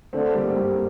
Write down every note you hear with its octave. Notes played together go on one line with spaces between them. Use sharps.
D3 A3 C4
G3 A#3
C4
G3 A#3